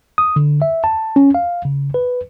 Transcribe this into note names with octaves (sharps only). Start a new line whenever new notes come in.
D#6
D3
E5
A5
C#4
F5
C#3
B4